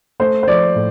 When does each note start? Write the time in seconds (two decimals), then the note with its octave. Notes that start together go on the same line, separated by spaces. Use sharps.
0.20 A3 C5
0.43 C5
0.47 F3 D5
0.76 A2